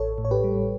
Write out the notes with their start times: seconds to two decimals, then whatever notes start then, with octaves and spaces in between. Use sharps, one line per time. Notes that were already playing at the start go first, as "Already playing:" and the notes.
Already playing: A1 A4 C#5
0.18 A2
0.25 C#5
0.31 G4 B4
0.44 G3